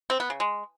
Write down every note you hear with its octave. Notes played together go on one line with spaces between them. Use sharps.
C4
B3
C#3
G#3